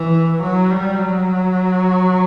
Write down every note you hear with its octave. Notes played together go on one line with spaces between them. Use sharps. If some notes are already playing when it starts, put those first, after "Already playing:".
Already playing: E3
F#3
G3
F#3